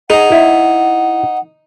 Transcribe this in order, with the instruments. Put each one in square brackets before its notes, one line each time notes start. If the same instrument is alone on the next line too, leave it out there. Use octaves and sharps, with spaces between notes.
[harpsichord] D#4 [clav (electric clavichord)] G#4 A#5 [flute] F#5
[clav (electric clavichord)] E4